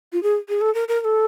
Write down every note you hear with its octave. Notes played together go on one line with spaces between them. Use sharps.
F4
G#4
G#4
A4
A#4
A#4
A#4
A4